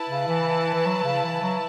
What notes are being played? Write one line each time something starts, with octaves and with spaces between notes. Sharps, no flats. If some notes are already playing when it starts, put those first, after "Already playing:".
Already playing: E4 B4 A5
C#3
E3
E3
F#3
C#3
E3
F#3